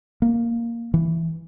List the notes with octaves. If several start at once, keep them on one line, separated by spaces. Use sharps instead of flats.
A#3
E3